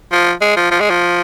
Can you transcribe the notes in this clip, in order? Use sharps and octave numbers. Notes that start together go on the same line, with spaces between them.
F3
G#3
F3
F3
G#3
F3